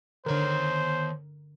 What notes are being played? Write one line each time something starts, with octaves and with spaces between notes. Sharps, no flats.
D3 D#3 A#4 C5 C#5